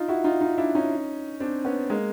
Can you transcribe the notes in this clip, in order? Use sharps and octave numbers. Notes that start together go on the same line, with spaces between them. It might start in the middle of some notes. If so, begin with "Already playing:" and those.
Already playing: D#4 F4
E4 F#4
D#4 F4
D#4 F4
D4 E4
C#4 D#4
C4 D4
B3 C#4
G#3 A#3